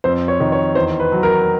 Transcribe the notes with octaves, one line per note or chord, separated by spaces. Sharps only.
F2 C5
C#5
D#3
C#5
E2 C5
B4
F#3
A#4